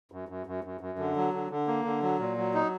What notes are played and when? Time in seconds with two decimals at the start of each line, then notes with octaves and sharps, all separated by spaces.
0.12 F#2
0.29 F#2
0.47 F#2
0.64 F#2
0.81 F#2
0.99 D3
1.16 F#3
1.34 D3
1.51 D3
1.67 A#3
1.85 D3
2.03 F#3
2.19 A#2
2.37 F#3
2.54 D#4